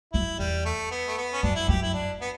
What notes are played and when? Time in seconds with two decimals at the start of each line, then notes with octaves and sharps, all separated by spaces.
0.13 F#2 E4
0.39 E2 G3
0.65 A3
0.91 B3
1.07 A3
1.18 B3
1.33 C#4
1.43 F#2 D4
1.55 E4
1.68 F#2 G4
1.82 E4
1.94 D4
2.21 B3